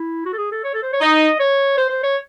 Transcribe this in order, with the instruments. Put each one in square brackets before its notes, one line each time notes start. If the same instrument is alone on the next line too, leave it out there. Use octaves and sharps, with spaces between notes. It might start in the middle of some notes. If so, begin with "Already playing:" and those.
Already playing: [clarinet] E4
F#4
A4
G#4
A4
C#5
A4
C5
C#5
[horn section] D#4 [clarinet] D#5
[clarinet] C#5
C5
C5
C#5